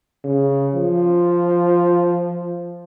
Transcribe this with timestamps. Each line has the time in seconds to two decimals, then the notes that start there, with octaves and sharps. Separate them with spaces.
0.25 C#3
0.75 F3